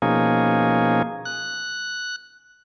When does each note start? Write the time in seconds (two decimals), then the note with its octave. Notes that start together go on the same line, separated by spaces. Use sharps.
0.02 B2 F3 A#3 C#4 D#4 G#4
1.25 F#6